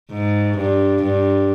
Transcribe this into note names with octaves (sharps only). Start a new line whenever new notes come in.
G#2
G2
G2